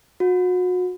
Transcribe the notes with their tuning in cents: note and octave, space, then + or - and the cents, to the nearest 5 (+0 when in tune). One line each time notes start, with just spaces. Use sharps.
F#4 -35